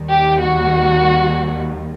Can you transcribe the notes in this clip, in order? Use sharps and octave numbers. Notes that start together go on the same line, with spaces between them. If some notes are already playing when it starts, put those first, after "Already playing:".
Already playing: D#2 D#3 G3
G4
F#4